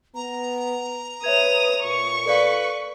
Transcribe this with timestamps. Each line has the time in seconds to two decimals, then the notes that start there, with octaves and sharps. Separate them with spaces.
0.15 B3 A#5
1.24 B4 C#5 E5 D#6 G#6 F7
1.84 A#2 C#6
2.26 A4 B4 D5 F5